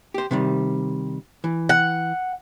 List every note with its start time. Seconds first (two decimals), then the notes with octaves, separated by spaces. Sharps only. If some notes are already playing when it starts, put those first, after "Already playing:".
0.14 G4 C5
0.31 C3 D#3 G3
1.44 E3
1.69 F#5